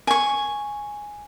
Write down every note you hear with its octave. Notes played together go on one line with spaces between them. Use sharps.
G#5 C#6